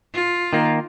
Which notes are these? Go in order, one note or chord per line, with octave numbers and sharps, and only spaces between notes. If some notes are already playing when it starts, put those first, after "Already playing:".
F4
D#3 A#3